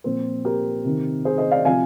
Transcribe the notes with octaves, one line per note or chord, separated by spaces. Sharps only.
A#2 F3 C4
G4 A#4
C3 D#3
G#4 C5
C5 D#5
D5 F5
C3 F3 F5 G#5